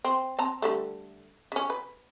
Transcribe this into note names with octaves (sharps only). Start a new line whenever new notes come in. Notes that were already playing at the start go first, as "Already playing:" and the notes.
C4
C4 A5 A#5
D3 G3 A3
C#3 C#4
B4